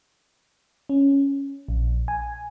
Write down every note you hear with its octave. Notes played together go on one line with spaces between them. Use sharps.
C#4
A#1
G#5